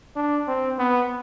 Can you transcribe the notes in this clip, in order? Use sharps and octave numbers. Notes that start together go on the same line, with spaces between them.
D4
C4
B3